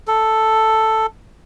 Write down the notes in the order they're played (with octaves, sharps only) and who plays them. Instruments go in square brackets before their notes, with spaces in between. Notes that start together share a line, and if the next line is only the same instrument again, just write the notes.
[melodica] A4